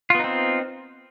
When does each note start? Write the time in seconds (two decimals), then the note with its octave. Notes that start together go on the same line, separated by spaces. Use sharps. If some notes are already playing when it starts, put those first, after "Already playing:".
0.10 F4
0.15 B3
0.19 D#4
0.24 C4